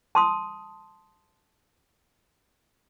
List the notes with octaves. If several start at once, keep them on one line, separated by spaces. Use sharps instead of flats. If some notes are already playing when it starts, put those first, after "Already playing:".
A5 C6 D#6